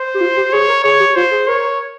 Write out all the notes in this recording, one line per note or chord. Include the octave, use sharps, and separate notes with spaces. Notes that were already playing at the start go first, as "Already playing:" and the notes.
Already playing: C5
G4
F4
G4
G#4 C#5
A#4
G#4 C#5
G4
F4 C5
G#4
A#4 C#5